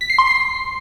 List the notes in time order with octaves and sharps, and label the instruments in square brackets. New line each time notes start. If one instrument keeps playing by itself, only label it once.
[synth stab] B6
C7
C6
C7